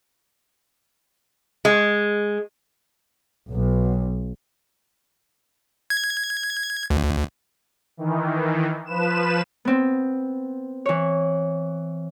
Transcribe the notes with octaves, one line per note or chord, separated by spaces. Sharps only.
G#3
B1
G#6
D2
D#3 E3
F3 B4 E7
B3 C4
E3 C#5